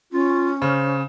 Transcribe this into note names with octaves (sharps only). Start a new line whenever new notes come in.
C#4 F4
C#3 C5